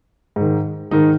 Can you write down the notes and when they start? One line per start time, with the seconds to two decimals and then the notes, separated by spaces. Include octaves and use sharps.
0.36 G#2 D#3
0.91 G#2 D#3 D#4